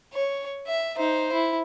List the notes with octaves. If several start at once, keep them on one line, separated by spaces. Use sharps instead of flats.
C#5
E5
D#4 C5
E4